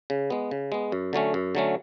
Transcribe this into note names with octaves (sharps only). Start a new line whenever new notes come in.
C#3
G#3 B3
C#3
G#3 B3
F#2
D3 F#3 A3 C#4
F#2
D3 F#3 A3 C#4